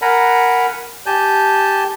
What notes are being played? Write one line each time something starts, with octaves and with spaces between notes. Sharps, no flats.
A#4 F#5 G#5 A#5 B5
G4 G#5 A5 G6